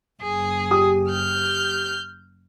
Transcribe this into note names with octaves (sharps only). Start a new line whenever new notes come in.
F#1 G#4
G4 D#6
F6 G6